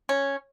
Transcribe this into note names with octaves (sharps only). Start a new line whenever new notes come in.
C#4